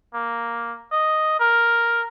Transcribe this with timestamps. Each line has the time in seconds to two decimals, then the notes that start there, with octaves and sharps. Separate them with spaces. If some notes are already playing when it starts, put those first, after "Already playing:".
0.14 A#3
0.92 D#5
1.40 A#4